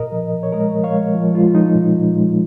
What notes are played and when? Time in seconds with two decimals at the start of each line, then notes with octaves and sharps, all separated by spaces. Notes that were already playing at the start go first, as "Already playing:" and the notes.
Already playing: A#2 A#4 D#5
0.12 F3
0.33 A#2
0.43 C#5
0.52 G#3 A#4 D#5
0.73 F3
0.84 C#5 F5
0.94 G#3
1.15 F3
1.34 G#3 F4
1.55 F3 D#4
1.76 A#2
1.96 A#2
2.16 G#3